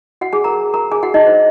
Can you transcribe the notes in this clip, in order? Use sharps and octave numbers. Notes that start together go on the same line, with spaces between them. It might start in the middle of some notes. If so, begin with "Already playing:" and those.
F#4 F#5
G#4 G#5
A#4 A#5
A#4 A#5
G#4 G#5
F#4 F#5
D#4 D#5
C5